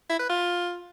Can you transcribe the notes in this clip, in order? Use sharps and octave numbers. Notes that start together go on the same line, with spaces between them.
E4
B4
F4